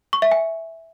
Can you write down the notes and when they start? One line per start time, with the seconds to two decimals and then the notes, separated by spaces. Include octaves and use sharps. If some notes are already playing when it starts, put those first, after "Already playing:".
0.13 C#6
0.22 E5
0.31 G#5